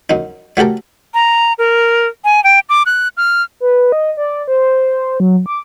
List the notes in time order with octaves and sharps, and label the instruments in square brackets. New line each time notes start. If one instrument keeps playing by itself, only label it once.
[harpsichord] F#2 D#4
F#3 A3 G4 A4 A#4
[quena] A#5
A#4
G#5
G5
D6
F#6
F6
[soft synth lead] B4
D#5
D5
C5
F#3
D6